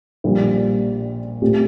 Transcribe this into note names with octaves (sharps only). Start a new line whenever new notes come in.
A#1 A#2 G3
A#2 A3 C4 G4